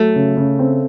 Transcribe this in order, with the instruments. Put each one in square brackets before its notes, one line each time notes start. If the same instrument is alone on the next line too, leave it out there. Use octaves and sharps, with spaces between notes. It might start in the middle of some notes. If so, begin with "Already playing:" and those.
Already playing: [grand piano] F#3 [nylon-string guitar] A3
[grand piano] C#3
C#3
C4